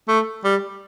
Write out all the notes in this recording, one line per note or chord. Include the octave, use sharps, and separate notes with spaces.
A3
G3